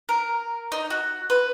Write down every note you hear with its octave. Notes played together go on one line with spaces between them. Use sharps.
A#4
D#4
F#4
B4